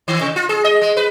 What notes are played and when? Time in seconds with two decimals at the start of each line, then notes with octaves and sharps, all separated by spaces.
0.08 D#3
0.21 C3
0.36 F4
0.49 G#4
0.64 D#5
0.82 G#3
0.97 B4